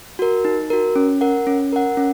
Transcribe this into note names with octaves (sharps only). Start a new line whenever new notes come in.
F#4 A#4
D#4
F#4 A#4
C#4
A#4 F#5
C#4
A#4 F#5
C#4